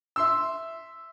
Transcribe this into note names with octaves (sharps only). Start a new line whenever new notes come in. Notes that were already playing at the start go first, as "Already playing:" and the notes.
E5 C6 E6